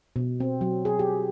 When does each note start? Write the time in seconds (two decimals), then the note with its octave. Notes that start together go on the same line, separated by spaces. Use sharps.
0.16 B2
0.40 C4
0.61 F#3
0.85 G#4
0.99 G4